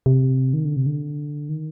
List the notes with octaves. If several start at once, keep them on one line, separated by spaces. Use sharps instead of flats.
C3
D#3
D3
C3
D3
D#3